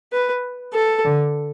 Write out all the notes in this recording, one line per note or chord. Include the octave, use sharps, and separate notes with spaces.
B4
A4
D3